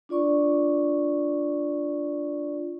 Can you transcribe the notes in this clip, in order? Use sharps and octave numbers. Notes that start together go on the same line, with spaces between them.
D4 F4 D5 C#6